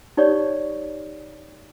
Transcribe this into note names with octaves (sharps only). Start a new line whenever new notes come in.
D#4 G4 C#5 D5 C#6